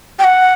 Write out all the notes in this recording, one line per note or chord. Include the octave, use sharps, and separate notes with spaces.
G5
F#5